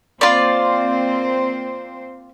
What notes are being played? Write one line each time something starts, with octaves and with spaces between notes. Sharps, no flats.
A#3 C4 F4 C5 D5